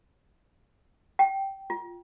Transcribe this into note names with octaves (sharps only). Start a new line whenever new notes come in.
G5
F4